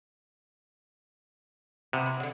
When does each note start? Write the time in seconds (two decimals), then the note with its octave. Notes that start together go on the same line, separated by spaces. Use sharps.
1.93 C3 B3
2.06 E4
2.20 D3 F#3